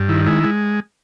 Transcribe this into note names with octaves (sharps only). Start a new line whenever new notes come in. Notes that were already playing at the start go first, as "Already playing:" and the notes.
Already playing: G2
D#3 E4
G#3 E4
G#3